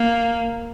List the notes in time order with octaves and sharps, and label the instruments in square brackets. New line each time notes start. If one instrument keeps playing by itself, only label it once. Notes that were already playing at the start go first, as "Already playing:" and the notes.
Already playing: [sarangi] A#3